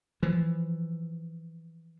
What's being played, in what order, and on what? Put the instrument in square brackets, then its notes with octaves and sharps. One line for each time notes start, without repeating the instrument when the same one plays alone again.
[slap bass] E3 F3